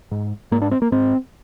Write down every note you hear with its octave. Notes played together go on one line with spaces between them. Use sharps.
G#2
G#2 A#3
D4
C4
A#3
G#2 C4